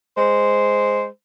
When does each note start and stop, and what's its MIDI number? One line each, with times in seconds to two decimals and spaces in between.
0.16 1.07 56
0.16 1.07 72